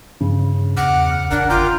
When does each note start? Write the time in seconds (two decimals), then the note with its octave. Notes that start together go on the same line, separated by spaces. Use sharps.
0.21 G2 C#3
0.77 E2 F#5 D6 F6
1.30 A1 D4 A#4 F#5
1.50 G1 F4 A#4 G5 D6